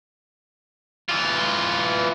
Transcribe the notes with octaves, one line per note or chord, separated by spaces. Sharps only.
E3 F4